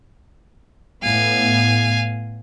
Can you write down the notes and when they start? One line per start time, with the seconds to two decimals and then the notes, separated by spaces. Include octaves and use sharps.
1.03 A2 B3 F5 G#5